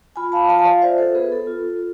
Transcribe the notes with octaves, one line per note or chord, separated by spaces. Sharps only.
F4 G#5 B5
F5 A5
F4 F5 A5
G#5
D5 F5
F4 C5 E5
A4 C5
B3 G#4 B4
A4
F4